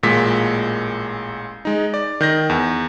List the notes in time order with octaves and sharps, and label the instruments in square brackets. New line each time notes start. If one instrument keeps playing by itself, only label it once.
[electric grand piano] A1 A#2 G#3 B6
G#3 D#4
D5
D#3 G6 A#6
E2